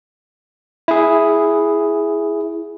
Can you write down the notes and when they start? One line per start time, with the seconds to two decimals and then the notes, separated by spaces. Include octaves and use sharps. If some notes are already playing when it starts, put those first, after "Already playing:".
0.88 E4 G#4